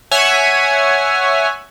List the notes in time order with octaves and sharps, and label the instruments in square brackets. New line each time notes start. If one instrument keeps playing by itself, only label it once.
[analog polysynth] C#5 E5 F#5 G#5